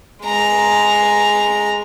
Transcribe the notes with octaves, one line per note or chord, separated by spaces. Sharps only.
G#3 A#5